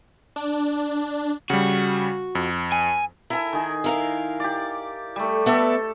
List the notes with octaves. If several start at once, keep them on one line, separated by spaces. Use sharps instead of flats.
D4
C#3 G3 F#4
F2
G#5
E4 A4 A#4 G#5
D#3 G#4
E4 A#4 F5
G4 D5
G3 A3
B3 A4 D5 E5